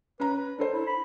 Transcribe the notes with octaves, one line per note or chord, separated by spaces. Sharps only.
C#4 B4 A#5
D4 A4 C5
E4
B5